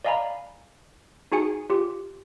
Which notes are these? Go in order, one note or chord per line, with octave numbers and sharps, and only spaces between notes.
D5 D#5 F5 G#5 A#5 B5
D#4 F#4 G#4 G#5 C#7
F4 G4